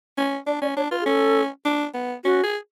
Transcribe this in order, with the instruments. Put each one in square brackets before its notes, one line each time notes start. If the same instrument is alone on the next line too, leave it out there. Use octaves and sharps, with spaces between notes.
[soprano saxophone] C#4
[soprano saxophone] D4 [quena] D5
[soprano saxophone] C#4 [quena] D5
[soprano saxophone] D4 [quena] C#5
[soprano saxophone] F4 [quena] B4
[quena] G#4
[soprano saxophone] C#4 [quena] A4
[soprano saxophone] D4
B3
[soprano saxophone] C#4 [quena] F#4
[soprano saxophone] G#4